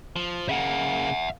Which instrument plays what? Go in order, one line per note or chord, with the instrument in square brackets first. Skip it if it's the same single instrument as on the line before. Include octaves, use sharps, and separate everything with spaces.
[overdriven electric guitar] F3
[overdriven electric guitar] C#3 A#3 [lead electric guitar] E5 F#5